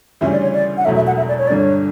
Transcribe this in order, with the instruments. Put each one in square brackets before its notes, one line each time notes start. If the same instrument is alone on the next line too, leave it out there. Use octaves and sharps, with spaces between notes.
[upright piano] D2 C#3 E3 G3 C#4 [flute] E5
[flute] D5
C#5
D5
F#5
[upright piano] E1 E2 B2 F#3 A3 [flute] E5
[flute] E5
F#5
E5
D5
C#5
[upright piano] G1 G2 D3 [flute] D5
[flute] C#5